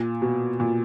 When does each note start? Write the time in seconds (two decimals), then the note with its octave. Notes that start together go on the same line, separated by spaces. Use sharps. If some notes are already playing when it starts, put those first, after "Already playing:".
Already playing: A#2
0.22 B2
0.60 A#2